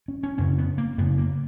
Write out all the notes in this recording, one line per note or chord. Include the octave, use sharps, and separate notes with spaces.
C#4
C#4
F#2 C#3 C#4
B3
A#3
F#2 C#3 B3
A#3